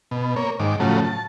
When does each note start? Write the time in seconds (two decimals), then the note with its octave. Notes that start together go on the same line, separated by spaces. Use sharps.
0.11 B2
0.36 A#3 C#5
0.60 G#2 D#3 D6
0.80 A2 C#3 F3 F#3 A3
1.04 A5